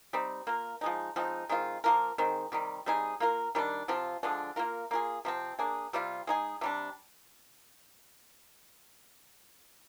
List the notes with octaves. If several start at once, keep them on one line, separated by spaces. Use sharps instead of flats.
G3 C4 D#4
A#3 F4 A#4
F3 G#3 D#4
F3 G#3 C4 D#4
D#3 G#3 C4 F4
F3 A#3 F4 A#4
D#3 G#3 C4
C3 D#3 G3
G3 C4 D#4 G#4
A#3 F4 A#4
D#3 G3 D4
C3 F3 C4 F4
D3 F3 G#3 D4
A#3 F4 A#4
A#3 F4 G#4
C3 F3 C4
A#3 D4 G#4
C3 G3 C4 F4
G#3 D#4 G#4
C3 G3 D4